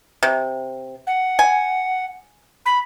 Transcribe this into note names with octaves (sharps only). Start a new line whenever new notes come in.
C3
F#5
G#5
B5